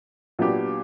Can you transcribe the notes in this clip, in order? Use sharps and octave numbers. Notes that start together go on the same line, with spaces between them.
A#2 F#3 B3 D4 G4